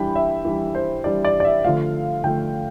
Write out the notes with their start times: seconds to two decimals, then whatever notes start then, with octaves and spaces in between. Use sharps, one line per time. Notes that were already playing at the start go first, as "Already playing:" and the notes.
Already playing: E3 G3 D4 G5 B5
0.15 E5
0.45 E3 G3 D4
0.75 C5
1.04 E3 G3 D4 D5
1.25 D5
1.40 D5
1.45 E5
1.64 D3 F3 A3 F5
2.24 D3 F3 A3 G5